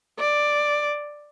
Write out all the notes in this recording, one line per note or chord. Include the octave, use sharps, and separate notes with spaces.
D5